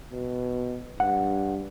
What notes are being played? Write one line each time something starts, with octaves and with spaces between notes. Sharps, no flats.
B2
G2 F#5